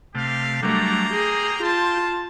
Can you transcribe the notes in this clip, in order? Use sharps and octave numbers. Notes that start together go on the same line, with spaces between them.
C3 A3 G4 F5
F#3 G3 A3 A#3 D4 A#5
G#4 G5
F4 A5